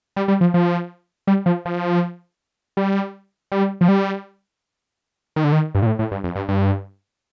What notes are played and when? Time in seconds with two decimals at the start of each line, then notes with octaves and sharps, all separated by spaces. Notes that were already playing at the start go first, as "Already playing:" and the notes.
0.16 G3
0.28 G3
0.41 F3
0.54 F3
1.27 G3
1.46 F3
1.65 F3
2.77 G3
3.52 G3
3.81 F3
3.88 G3
5.36 D#3
5.44 D3
5.52 D#3
5.75 G2
5.82 A#2
5.86 A2
5.99 A2
6.12 G2
6.24 F2
6.36 G2
6.48 G2